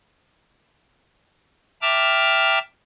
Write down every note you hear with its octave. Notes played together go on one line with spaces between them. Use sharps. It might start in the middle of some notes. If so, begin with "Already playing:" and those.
E5 G5 A5 A#5 D6 F6